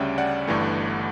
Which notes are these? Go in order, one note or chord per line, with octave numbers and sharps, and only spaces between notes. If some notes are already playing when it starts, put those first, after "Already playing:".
Already playing: D2 C#3 G3 C#4 D5 E5 F#5 G5
D5 F#5
G1 G2 E3 A3